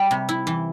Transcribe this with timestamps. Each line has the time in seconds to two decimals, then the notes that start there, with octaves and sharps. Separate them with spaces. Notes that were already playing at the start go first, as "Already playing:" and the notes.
Already playing: G3 B5
0.11 C3
0.29 E4
0.47 E3